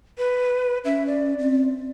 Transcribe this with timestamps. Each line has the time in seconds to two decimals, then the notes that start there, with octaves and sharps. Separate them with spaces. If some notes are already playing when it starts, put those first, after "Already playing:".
0.18 B4
0.85 C#4 E5
1.06 D5
1.39 C4